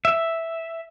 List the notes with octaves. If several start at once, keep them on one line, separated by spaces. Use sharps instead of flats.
E5